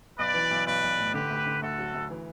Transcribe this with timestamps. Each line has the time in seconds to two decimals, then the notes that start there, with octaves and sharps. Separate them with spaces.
0.19 B1 B4 D5
0.34 E3
0.51 B1
0.67 B1 B4 D5
0.82 B1
0.98 A2
1.14 D3 G4 B4
1.30 D2
1.46 D3
1.62 D2 F#4 A4
1.78 F#3
1.95 D2
2.10 E3